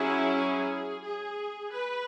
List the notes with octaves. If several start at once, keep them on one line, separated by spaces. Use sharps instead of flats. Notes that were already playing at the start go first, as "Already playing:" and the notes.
Already playing: F#3 C#4 E4 G#4
G#4
G#4
B4